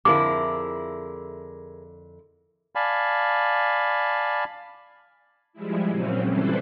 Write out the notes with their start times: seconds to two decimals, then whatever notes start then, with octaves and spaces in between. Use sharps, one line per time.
0.05 F2 D3 E4 G#4 A#4 D6
2.75 D5 F5 G#5 A5 B5
5.53 F3 G3 G#3 E4
5.88 A#2 C#3 F#3 C4 C#4
6.26 E3 G3 E4 A4 B4 C5